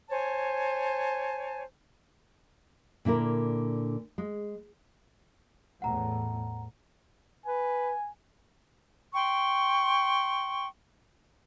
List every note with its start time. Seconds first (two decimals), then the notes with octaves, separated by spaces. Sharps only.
0.09 C5 C#5 G#5 A5
3.05 A#2 D3 E4 A#4
4.18 G#3
5.82 E2 A2 F#5 A#5
7.46 B4 G#5
9.15 G5 C6 C#6